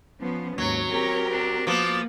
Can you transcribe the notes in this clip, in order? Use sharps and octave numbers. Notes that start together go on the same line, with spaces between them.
F3 B3 C#4
D#2 G#2 F#3 C#5
C4 G4 A#4
D4
F3 A#3 B3 D6